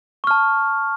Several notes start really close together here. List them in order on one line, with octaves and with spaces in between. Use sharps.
C#6 F6 A5